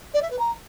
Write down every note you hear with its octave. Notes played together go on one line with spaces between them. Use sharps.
D5
E5
B4
A#5